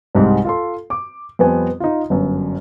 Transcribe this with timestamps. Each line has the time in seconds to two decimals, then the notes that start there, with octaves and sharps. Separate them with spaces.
0.15 C2 G#2 G3 G#3
0.45 F4 A4 C6
0.90 D6
1.39 F2 G3 B3 C4 G#5
1.80 D#4 F4
2.10 G1 F#2